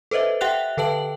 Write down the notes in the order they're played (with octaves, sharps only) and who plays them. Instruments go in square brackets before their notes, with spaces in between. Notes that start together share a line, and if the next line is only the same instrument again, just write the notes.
[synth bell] A4 B4 C5 D#5 E5
G4 E5 F#5 G5 F#6 F7
D3 A4 B4 G5 A5 F#7